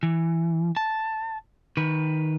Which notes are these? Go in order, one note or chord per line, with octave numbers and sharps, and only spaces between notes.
E3
A5
D#3 B4